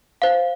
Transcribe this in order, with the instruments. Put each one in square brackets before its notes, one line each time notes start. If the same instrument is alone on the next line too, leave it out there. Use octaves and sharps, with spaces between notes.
[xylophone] C5 F5